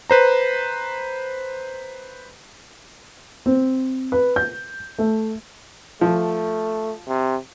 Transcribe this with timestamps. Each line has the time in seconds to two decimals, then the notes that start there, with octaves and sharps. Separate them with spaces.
0.10 B4 C5 A#5
3.46 C4
4.12 B4
4.36 G6
4.99 A3
6.01 F3 A3
7.08 C3